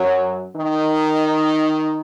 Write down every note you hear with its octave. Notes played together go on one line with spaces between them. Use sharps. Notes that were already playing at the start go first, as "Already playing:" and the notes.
Already playing: F#2 F#3
D#3 D#4